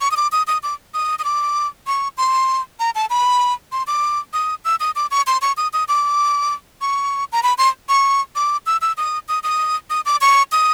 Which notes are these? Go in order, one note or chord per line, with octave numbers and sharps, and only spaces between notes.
C#6
D#6
D6
D#6
D#6
D6
D#6
D#6
D6
C#6
C6
A#5
A5
B5
C6
D6
D#6
E6
D#6
D6
C#6
C6
C#6
D#6
D#6
D6
C#6
A#5
B5
C6
C#6
D6
E6
E6
D#6
D#6
D#6
D#6
D6
C#6
D#6